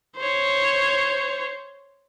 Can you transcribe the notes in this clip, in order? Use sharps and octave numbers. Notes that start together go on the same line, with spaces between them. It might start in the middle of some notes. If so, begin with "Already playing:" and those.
C5 C#5